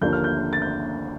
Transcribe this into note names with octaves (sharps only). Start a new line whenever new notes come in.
D#2 D3 F3 A#3 D4 G6
F6
G6
A6
G6